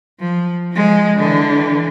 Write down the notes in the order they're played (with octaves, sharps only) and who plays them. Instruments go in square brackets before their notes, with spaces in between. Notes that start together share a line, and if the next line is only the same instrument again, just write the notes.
[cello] F3
F3 G#3
D3 E3